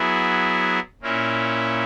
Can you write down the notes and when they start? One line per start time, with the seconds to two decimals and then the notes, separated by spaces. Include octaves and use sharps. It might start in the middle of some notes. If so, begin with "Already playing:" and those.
Already playing: F#3 B3 E4 G#4
1.02 A#2 A#3 C#4 E4